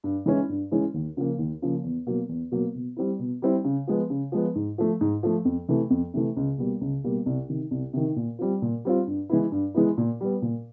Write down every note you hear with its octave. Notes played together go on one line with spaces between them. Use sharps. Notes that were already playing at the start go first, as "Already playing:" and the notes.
G2
E3 G#3 C#4 E4
G2
E3 G#3 C#4 E4
D#2
C#3 F3 A#3
D#2
C#3 F3 A#3
E2
B2 F#3 A#3
E2
B2 F#3 A#3
B2
G3 C4 E4
B2
G3 C4 E4
C#3
F3 G#3 B3
C#3
F3 G#3 B3
G#2
F3 A3
G#2
F3 A3
F2
C3 E3 A3
F2
C3 E3 A3
C#2
B2 G3 A#3
C#2
B2 G3 A#3
C2
C3 D#3
C2
C3 D#3
A#2
G3 C4 F4
A#2
G3 C4 F4
G2
E3 G#3 B3 E4
G2
E3 G#3 B3 E4
A#2
G3 B3
A#2